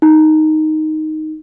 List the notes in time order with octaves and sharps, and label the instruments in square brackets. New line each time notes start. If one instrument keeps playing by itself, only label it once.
[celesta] D#4